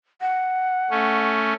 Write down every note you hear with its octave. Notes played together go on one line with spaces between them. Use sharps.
F#5
A3 C#4